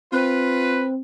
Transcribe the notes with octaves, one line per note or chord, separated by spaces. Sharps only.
C4 F4 B4